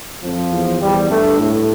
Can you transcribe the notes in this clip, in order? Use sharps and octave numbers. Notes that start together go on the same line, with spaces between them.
F2 F3
E2
E2 G3
G2 A3
A2 A3